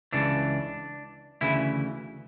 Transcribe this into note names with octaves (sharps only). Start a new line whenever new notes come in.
C#2 C#3 E3 D4
D2 C#3 E3 E4